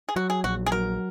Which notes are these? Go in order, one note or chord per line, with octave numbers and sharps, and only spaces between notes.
G#4
F#3 F#4
G#4
A#1 F#4
G#4
F#3 A#4